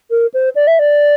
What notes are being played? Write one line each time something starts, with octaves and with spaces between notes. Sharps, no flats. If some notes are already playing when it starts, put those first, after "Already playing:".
A#4
C5
D5
E5
D5